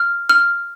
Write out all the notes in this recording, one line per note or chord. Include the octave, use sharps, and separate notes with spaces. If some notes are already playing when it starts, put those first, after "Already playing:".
Already playing: F6
F6